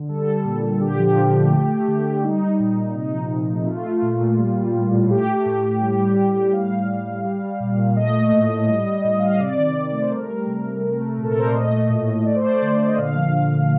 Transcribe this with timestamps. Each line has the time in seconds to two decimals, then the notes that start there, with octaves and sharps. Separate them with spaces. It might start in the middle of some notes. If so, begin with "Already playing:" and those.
Already playing: D3
0.09 G3 A4
0.27 G3
0.45 A#2
0.62 A#2
0.81 D3 G4
0.99 F3
1.16 D3
1.34 A3
1.52 A3
1.70 A3
1.88 D3
2.06 D3
2.23 G3 D#4
2.41 G3
2.60 A#2
2.77 A#2
2.95 C3 D#4
3.13 F3
3.31 C3
3.48 A3
3.67 A3 F4
3.85 A3
4.02 A#2
4.21 A#2
4.38 G3
4.57 G3
4.74 A2
4.93 A2
5.10 A3 G4
5.28 A3
5.46 A2
5.64 A2
5.81 G3
5.99 G3
6.17 A2
6.36 A2
6.53 G3 F5
6.70 G3
6.89 A2
7.06 A2
7.24 G3
7.43 G3
7.60 A#2
7.78 A#2
7.96 A3 D#5
8.14 A3
8.32 A2
8.50 A2
8.68 G3
8.86 G3
9.04 A2
9.19 A2 F5
9.29 D#5
9.39 C3 D5
9.58 D#3
9.76 C3
9.93 A3
10.02 C5
10.11 G3 A#4
10.29 G3
10.47 C3
10.65 C3
10.82 A3
11.01 A3
11.18 A#2 A4
11.31 A#4
11.36 A#2 C5
11.46 D5
11.55 A3 D#5
11.72 A3
11.90 A2
12.08 A2
12.26 A3 D5
12.35 C5
12.44 A3 D5
12.62 D3
12.79 D3
12.87 D#5
12.97 A#2 F5
13.16 F3
13.33 A#2
13.51 A3